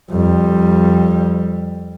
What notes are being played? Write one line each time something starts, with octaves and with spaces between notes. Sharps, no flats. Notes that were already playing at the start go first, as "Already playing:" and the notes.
F2 G3